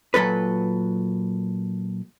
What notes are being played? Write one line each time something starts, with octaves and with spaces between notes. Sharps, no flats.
A#2 F#3 A4 B4